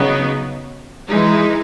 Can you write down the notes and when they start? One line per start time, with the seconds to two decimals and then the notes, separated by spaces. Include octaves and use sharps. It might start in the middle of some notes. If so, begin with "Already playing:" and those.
Already playing: C#3 F#3 B3 D#4
1.08 E3 G#3 D#4